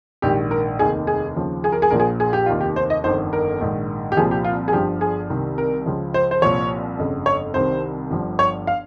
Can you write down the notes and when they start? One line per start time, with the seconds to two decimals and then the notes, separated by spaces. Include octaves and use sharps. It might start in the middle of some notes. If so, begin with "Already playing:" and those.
0.22 A#1 G#2 D#3 G4
0.51 A#4
0.79 F1 D#2 D#3 G#4
1.07 G#4
1.36 D#2 C#3 F3
1.64 G#4
1.72 A#4
1.82 G#4
1.90 A#1 A#2 F3 A#4
2.00 G#4
2.20 G#4
2.33 G4
2.46 F1 D#2 D#3 F4
2.61 G4
2.76 C5
2.90 D#5
3.04 G1 F2 D#3 C5
3.33 A#4
3.60 A#1 G#2 D#3
4.12 G4
4.17 C2 A#2 F3 G#4
4.31 G4
4.45 F4
4.68 G#4
4.73 G1 G2 F3 G4
5.01 G#4
5.29 C2 C3 D#3
5.58 A#4
5.86 C#2 C#3 F3
6.14 C5
6.31 C5
6.42 C2 A#2 F3 C#5
6.98 G1 F2 C#3
7.26 C#5
7.54 C2 C3 D#3 C5
8.10 G1 G2 F3
8.39 C#5
8.67 F5